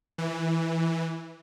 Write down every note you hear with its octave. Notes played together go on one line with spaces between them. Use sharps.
E3